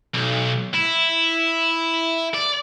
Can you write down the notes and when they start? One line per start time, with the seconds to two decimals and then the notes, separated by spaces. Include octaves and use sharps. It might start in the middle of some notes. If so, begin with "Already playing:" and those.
0.15 B1
0.74 E4
2.34 D5